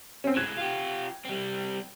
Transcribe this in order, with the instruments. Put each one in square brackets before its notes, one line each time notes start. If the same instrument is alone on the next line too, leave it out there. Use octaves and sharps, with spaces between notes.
[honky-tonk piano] C4 C#4
[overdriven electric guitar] A2 G#3 [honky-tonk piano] F#6 G#6 E7
[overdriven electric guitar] F4 G4
G3 C4